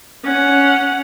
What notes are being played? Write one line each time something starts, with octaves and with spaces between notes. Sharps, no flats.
C#4 F#5